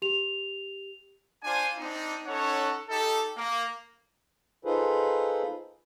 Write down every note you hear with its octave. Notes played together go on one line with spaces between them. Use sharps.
G4 F7
D4 F4 C5 G#5
C4 D4 D#4
C#4 D#4 A4 C#5 F#5
D#4 G4 A4
A#3
D#4 F4 G#4 A4 B4 C5